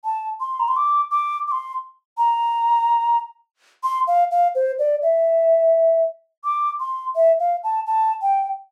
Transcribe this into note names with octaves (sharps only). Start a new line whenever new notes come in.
A5
C6
A#5
C6
D6
D6
D6
C6
A#5
C6
F5
F5
C5
D5
E5
D6
C6
E5
F5
A5
A5
G5